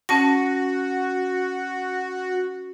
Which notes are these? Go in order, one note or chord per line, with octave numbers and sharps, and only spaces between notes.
C#4 F#4 A5 A#6